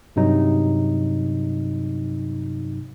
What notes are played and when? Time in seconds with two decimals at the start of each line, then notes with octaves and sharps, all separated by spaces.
0.16 G2 C3 F#3 D#4